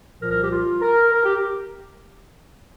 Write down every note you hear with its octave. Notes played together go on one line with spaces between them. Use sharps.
C2 A#2 F3 A#4
A#4
G4
F4
A#4
A#4
G4